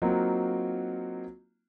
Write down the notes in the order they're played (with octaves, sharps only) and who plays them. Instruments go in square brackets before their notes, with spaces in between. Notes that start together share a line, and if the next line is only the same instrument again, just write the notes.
[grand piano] F#3 A#3 C4 D#4 F4 F#4